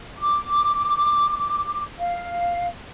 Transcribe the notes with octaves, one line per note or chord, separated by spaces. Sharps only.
D6
F5